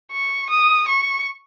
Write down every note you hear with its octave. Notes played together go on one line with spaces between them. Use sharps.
C#6
D#6
C#6